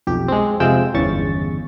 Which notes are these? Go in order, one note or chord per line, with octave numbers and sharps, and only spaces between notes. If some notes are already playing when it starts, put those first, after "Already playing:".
B1 F2 G4
G#3 C4
F2 C3 G#3 F4 G5 E6
G1 E2 C#3 C#6 A6